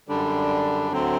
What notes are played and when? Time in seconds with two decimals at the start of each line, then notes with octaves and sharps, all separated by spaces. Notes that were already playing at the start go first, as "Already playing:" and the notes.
0.08 F#2 D3 G3 D4
0.92 D2 D3 F#3 C4